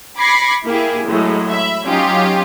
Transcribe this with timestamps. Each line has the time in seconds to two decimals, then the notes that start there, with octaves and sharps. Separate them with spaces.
0.19 B5 D6 G#6 A#6 C7 C#7
0.65 A#3 E4 G4 G#4
1.08 A2 F#3 G#3
1.51 E5 B5
1.85 F#3 C#4 D#4 F4 G4